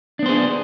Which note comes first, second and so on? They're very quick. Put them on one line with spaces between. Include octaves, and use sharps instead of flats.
D4 B3 C5 G#4